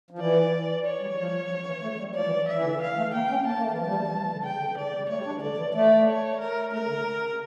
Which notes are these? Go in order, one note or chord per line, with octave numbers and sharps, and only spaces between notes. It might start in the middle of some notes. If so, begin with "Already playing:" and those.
F3
E3 D5
C#5
G3
F3
F3
E3
A3
G3
F3 D5
E3
E5
E3
D3
E3 F5
A3
A#3 G5
C#4
A#3 A5
A#3
A3
E3
F3 A5
G3
A3
E3
F3
E3
D3
C#3 G5
D3
E3
D3 D5
C#3
G3
A3 C#5
G3
D4
E3
D3 D5
E3
A3 D5
C#5
A#4
A3 A#4
D3
C#3